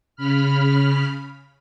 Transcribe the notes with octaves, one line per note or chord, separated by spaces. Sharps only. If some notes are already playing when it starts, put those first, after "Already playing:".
C#3 B5 F6